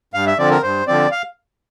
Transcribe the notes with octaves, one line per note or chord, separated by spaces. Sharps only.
G2 F5
E5
D3 F3 C4 D5
A#4
G2 C5
D3 F3 C4 D5
F5